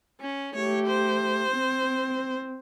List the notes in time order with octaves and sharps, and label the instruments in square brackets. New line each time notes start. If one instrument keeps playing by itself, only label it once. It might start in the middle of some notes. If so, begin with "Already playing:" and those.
[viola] C#4
[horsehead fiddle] A3 G4 [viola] C#5
[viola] C5
[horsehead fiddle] C4